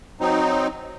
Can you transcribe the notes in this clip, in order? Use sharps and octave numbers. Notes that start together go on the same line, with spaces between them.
F#3 C4 D#4